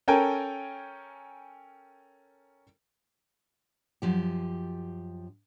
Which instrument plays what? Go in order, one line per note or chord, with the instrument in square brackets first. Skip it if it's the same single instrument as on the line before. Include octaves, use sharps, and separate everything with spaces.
[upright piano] C#4 A4 A#4 G5 G#5 A#5
[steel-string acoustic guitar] F#2 F3 G4